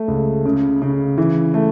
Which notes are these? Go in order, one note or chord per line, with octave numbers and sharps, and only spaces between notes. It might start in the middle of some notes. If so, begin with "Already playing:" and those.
Already playing: A3
C#2
C#3
C#3
E3
A3